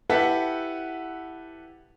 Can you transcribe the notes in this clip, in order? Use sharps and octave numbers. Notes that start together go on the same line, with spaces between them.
E4 G4 A4 B4 F#5 B6